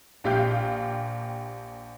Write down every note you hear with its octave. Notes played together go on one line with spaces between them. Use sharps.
A#1 G4 F5 G6